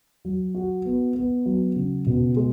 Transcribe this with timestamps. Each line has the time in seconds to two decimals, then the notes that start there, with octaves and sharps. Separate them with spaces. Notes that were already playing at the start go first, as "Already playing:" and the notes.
0.25 F#3
0.55 F#4
0.85 B3
1.15 B3
1.46 F#3
1.76 C#3
2.06 B2
2.36 G#3